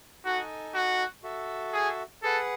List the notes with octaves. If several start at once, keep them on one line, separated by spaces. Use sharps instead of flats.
D#4 F#4 A4 D#5 G#5
F#4
F#4 A4 E5
G#4
G#4 A4 B4 F#5